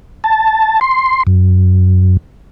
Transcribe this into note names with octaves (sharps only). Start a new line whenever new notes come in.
A5
C6
F#2